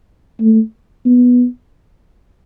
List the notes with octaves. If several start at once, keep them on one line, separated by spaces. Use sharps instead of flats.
A3
B3